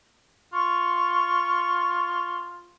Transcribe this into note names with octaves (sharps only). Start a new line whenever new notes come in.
F4 C#6